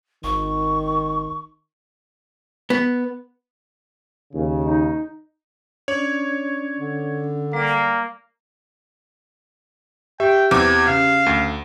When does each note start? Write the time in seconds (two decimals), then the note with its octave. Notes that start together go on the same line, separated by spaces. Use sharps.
0.24 G#1 D#3 C#6
2.70 B3
4.33 D#2 C#3
4.66 D#4
5.88 C#4 D4 C#5 D5
6.79 D3
7.53 G3 A#3 D5
10.20 G4 E5 G5
10.51 E2 C4 D6 G#6
10.86 C#3 F5
11.26 D2